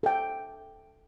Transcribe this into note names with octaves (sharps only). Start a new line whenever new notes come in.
A4 G5